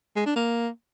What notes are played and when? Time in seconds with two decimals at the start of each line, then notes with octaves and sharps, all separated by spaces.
0.16 G#3
0.26 D4
0.36 A#3